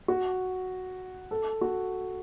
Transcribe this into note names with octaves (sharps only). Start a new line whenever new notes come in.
F#4
A4
F#4